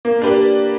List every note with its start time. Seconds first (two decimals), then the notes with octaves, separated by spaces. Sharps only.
0.05 A#3
0.22 D4 G4 B4 D5